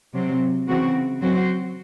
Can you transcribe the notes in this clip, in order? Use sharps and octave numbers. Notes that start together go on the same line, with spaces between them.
C3 F#3 C4
C#3 E3 C4 F#4
F#3 C4 F#4 C5